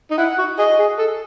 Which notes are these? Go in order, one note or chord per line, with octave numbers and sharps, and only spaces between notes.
D#4
E4 F#5
F#4
G#4 D#5
G#4
A4